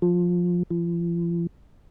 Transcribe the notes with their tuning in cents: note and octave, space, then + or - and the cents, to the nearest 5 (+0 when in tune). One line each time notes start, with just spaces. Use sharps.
F3 +15
F3 -40